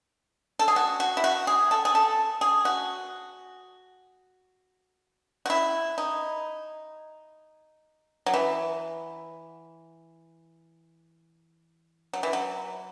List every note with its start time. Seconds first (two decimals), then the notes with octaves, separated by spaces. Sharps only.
0.59 A4
0.68 G#4
0.76 F#4
1.00 F#4
1.17 E4
1.24 F#4
1.47 G#4
1.71 A4
1.85 G#4
1.95 A4
2.41 G#4
2.65 F#4
5.46 F#4
5.50 E4
5.98 D#4
8.26 F#3
8.34 E3
12.13 F#3
12.23 E3
12.33 F#3